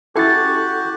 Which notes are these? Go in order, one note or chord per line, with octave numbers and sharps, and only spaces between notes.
C#4 E4 F#4 G4 A4 E5 A6